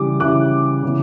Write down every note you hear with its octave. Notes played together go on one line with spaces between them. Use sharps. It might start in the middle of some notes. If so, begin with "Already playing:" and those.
Already playing: C#3 E3 G3 D6
C#3 E3 G3 D6 F#6
C#3 E3 B3